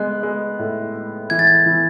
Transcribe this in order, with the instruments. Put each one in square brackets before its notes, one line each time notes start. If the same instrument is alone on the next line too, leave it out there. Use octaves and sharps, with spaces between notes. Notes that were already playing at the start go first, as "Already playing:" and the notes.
Already playing: [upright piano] G#3 B3 [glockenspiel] F#6
[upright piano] G#3
A2
G#3
[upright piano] E3 [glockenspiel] G#6
[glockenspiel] A6
G#6
[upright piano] E3